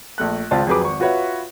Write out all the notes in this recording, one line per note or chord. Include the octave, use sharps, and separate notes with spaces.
A#1 A3 F#6
G#1 C#2 C4 F4 D5 A5
F2 F#3 G#4 B4 D6
G#1 C#6
F4 F#4 B4 C#5 E5 F#5